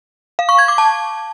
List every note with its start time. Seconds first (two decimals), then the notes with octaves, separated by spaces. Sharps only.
0.39 F5
0.49 C#6
0.58 G#6
0.68 D6
0.78 A5